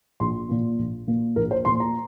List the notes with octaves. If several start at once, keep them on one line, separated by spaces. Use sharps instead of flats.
A#1 C6
A#2 A#3
A#1
A#2 A#3
A#1 A#4
C5
A#2 A#3 C6
A#5